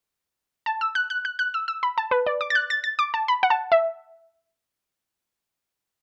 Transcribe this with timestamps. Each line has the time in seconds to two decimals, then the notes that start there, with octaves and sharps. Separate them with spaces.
0.66 A5
0.81 E6
0.95 F#6
1.10 F#6
1.25 F#6
1.39 F#6
1.54 E6
1.68 E6
1.83 B5
1.98 A5
2.11 B4
2.26 D5
2.41 D6
2.50 A6
2.55 F#6
2.70 A6
2.84 A6
2.99 D6
3.14 A5
3.28 B5
3.43 F#5
3.50 A5
3.72 E5